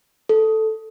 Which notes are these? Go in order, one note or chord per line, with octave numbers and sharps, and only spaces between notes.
A4